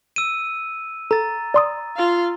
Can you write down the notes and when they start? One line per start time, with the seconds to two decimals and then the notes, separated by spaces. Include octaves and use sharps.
0.16 E6 D#7
1.11 A4 A#5 A6
1.54 D5 C6 D#6
1.97 F4 F5